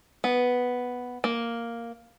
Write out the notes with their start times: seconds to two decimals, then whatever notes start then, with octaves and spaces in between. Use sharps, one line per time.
0.24 B3
1.24 A#3